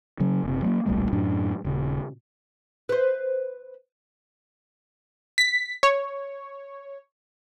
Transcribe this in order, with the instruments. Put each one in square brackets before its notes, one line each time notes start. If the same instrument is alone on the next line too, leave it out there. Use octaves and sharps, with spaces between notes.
[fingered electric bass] C#3 F#3 C#4
F#1 C3
F#3 G#3 A#3
D1 A#1 G3 A3
F#2 A2 F#3 D4
D#1 C#3
[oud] B4 C5
[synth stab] B6
C#5